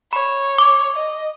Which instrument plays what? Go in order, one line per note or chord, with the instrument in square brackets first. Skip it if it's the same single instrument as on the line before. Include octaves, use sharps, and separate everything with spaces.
[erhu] C#5 [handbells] B5
[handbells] D6
[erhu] D#5